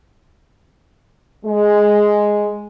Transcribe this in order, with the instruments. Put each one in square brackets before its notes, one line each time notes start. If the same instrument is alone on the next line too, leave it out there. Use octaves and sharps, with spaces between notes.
[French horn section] G#3